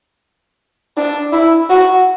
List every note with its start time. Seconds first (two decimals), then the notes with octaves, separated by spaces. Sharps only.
0.97 D4
1.32 E4
1.70 F#4